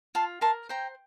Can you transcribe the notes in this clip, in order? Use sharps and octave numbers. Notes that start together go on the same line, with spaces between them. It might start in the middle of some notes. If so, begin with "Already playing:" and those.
F4 A5 C6
A#4 A5 C6
C5 G5 A#5